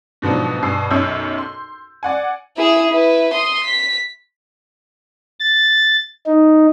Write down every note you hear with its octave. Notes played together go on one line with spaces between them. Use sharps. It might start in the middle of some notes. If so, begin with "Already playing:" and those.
G#2 B2 D3 F3 F#3
G2 B2 G#5 E6 C7
B1 F#2 C#5 E6 G6
C6
D5 F#5 G#5
E4 G#4
E4 B4
C6 D#6
B6
A6
D#4